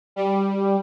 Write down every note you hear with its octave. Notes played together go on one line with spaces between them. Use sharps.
G3